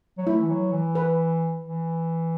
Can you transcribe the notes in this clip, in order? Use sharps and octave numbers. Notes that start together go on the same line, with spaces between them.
F#3
A3 E4
E3
F#3
E3
B4
E3